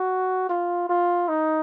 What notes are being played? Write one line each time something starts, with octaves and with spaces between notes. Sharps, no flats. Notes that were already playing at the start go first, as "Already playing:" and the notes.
Already playing: F#4
F4
F4
D#4